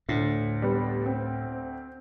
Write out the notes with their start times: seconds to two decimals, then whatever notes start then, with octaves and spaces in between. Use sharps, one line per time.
0.09 D2 A2
0.62 G3 B3
1.06 C4